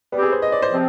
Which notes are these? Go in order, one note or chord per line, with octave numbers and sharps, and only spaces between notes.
G3 B3 C4 G4
G#4
C5
D#5
D5
C5
C3 F3 C4